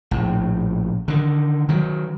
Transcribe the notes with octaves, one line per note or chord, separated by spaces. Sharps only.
A#1 A2
D3 D#3
D#3 F#3